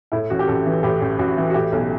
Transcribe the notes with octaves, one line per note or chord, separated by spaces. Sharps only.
A2 E4
A1 F#4
G4
A1 A4
E3
A2 G4
A1
A1 F#4
E3
F#4
A2 G4
B1